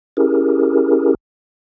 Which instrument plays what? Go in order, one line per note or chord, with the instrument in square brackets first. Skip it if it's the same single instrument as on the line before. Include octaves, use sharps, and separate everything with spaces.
[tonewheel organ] C#4 E4 G4 G#4 A#4